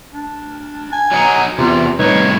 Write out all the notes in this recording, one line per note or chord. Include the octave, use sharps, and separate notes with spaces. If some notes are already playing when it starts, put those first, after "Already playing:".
D4
G#5
F#3 D#4
E2 C3 F4
C2 A2 D#4 B4 C#5